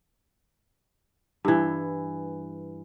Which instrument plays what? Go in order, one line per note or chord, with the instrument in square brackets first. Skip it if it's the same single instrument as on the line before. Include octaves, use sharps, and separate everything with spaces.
[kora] G2 E3